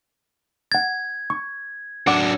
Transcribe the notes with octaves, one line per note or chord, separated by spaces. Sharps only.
F#5 G#6 A6
C#6
F#3 D4 F#5 D6 D7